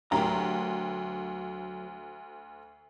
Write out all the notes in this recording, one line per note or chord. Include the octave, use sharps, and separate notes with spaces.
D2 F#3 G4 A#4 A#5